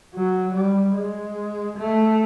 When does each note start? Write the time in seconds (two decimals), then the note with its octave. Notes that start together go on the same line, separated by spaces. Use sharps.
0.14 F#3
0.55 G3
0.95 G#3
1.78 A3